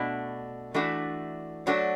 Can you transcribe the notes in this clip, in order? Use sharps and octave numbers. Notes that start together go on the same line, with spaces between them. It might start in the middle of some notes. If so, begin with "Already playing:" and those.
Already playing: B2 A3 D4 F#4
E3 A3 D4 F#4
F#3 A3 D4 F#4